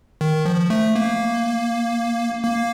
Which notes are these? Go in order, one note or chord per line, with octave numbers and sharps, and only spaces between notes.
D#3
F3
A3
A#3
A#3